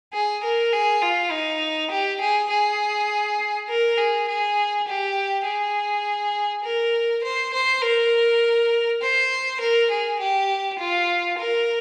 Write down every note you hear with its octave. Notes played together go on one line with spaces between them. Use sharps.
G#4
A#4
G#4
F4
D#4
G4
G#4
G#4
A#4
G#4
G#4
G4
G#4
A#4
C5
C5
A#4
C5
A#4
G#4
G4
F4
A#4